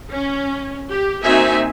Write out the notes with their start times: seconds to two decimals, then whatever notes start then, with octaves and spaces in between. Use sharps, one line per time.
0.12 C#4
0.89 G4
1.22 A#3 C4 D#4 F#4 E5 G#5